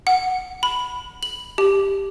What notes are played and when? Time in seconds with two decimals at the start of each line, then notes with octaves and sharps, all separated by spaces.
0.07 F#5
0.63 B5
1.23 F#7
1.58 G4